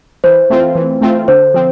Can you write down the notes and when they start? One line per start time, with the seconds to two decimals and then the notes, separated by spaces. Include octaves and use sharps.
0.24 E3 C5
0.50 A3 C4 F4
0.75 E3
1.02 A3 C4 F4
1.28 D3 C5
1.54 F3 C4